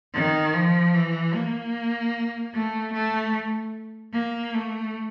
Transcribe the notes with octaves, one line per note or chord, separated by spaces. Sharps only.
D#3
F3
E3
A#3
A3
A3
A#3
A3